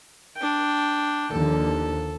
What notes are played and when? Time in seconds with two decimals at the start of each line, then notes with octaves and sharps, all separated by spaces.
0.36 D4 G5
1.32 D#2 D3 F3 A4